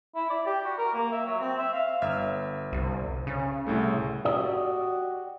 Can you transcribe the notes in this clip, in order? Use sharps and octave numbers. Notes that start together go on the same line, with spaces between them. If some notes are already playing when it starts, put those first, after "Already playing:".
E4
D5
G4
F#4
A#4
A#3
E5
F#3
C4
E5
F5
G1 E5 F6
C2
C#3
C2 A2 A3
F#4 G4 D5 D#5